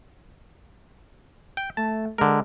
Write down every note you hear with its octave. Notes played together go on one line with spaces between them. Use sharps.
G5
A3 A5
D3 G#3 A#4